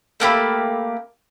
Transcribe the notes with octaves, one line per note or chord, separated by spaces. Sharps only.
A3 A#3 G4 B5